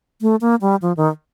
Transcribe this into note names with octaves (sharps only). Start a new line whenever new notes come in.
A3
A#3
G3
F3
D#3